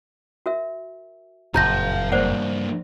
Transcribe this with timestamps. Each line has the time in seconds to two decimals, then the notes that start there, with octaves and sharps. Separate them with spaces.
0.46 F#4 A#4 E5
1.54 F#1 F2 A#2 F5 A5 A#5 G6 A#6
2.12 G2 A#3 C5 D5 F#5